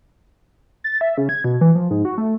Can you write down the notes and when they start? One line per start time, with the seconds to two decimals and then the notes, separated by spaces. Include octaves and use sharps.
0.84 A6
1.01 E5
1.17 C#3
1.29 G#6
1.44 B2
1.61 E3
1.75 F3
1.91 G#2
2.05 F#4
2.18 A3